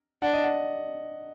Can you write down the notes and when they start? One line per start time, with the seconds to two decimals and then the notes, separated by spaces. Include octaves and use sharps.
0.22 D4 F#5
0.33 D#5
0.44 F#5